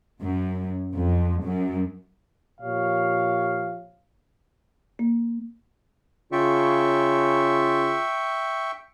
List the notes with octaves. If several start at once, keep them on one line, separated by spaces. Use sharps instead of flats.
F#2
F2
F#2
A#2 F3 G4 C#5 F5
A#3
C#3 F4 E5 G5 C#6